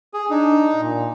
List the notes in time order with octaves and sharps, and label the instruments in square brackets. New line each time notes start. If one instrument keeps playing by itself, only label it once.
[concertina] G#4
[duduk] D4 [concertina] D#4
[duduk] A#2